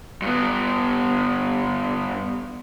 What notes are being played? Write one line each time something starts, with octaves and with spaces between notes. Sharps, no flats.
G2 B3